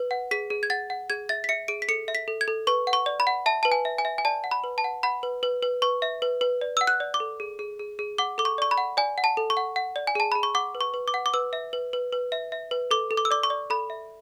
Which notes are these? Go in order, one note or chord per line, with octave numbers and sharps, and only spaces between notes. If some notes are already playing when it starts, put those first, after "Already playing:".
Already playing: B4
F#5
G#4 B6
G#4
G#6
F#5 A6
F#5
G#4 G#6
E5 A6
B6
E5 C#7
G#4 D7
B6
A4 C#7
E5
B6
A4
G#6
A4
B4 C#6
F#5
C#6
D5
B5
F#5
E5 A5
B4 A5
G#5
E5
G#5
E5
G#5
D5 A5
F#5
B5
B4
A5
F#5
F#5 B5
B4
B4
B4
B4 C#6
E5
B4
B4
D5
F#5 E6
F#6
D5
D6
A4
G#4
G#4
G#4
G#4
F#5 D6
A4 D6
C#6
D5 C#6
B5
F#5
D5 G#5
F#5
A5
A4
C#6
F#5
F#5
D5
G#5
G#4 A5
G#4 B5
C#6
F#5 D6
B4
C#6
B4
D6
F#5
D6
B4 E6
E5
B4
B4
B4
E5
E5
B4
A4 D6
A4
D6
E6
D5 D6
C#6
D5
A4 B5
E5